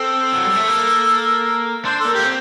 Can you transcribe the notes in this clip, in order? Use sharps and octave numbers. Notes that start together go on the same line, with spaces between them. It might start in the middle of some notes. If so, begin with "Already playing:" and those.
Already playing: C4 A4
F#3
G3
A3
A#3
D4 C5
A4
A#3
G4
A#3
C4